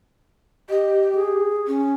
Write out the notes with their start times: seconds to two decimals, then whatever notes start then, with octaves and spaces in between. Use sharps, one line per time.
0.70 G4 D#5
1.15 G#4
1.67 C#4